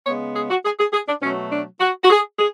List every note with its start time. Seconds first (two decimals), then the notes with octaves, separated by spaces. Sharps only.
0.06 C#3 G#3 B3 C#5
0.35 G#4
0.50 F#4
0.65 G#4
0.79 G#4
0.93 G#4
1.08 D4
1.22 B2 F#3 A3 C#4
1.52 D4
1.80 F#4
2.03 F#4
2.10 G#4
2.38 G#4